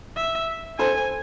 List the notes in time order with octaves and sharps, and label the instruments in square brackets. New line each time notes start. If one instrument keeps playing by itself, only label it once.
[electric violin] E5
[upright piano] A4 C5 [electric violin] G#5